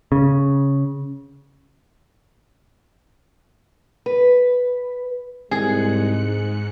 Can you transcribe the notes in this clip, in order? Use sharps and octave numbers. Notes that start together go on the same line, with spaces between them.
C#3
B4
C2 G#2 G#3 G#4 F#6 C#7